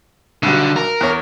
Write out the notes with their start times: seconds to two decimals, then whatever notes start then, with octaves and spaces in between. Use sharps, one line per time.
0.43 B1 D3 G3 F#4
0.76 A#4
1.01 E2 C#5